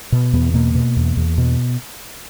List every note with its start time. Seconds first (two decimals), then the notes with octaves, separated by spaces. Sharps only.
0.12 B2
0.33 E2 B3
0.54 B2 A#3
0.75 B2
0.97 E2
1.17 E2
1.38 B2